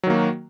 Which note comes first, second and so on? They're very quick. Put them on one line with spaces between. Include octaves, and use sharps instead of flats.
F#3 D#3 A#3 F#4